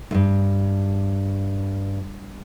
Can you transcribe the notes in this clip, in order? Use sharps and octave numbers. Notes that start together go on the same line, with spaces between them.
D2 G2